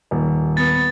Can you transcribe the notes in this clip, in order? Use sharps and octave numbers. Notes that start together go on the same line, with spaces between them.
D#1
B3 A6